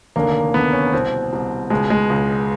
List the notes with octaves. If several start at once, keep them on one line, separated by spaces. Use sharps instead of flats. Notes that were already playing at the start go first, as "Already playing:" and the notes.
F1 D#2 D3 A#3
F1 D#2 D3 B3
C#4
C2 B2 C4
C2 B2
C#2 B2 G#3
G#3
C#2 B2